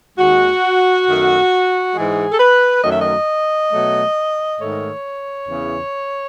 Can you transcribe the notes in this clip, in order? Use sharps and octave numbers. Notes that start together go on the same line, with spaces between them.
D#2 D#3 G#3 F#4
F#2 D#3 A3
G#2 E3 G#3 G#4
A4
B4
F#2 D#3 F#3 A3 D#5
E5
D#5
B2 F#3 A3
G#2 D#3 A3 C#5
E2 C#3 E3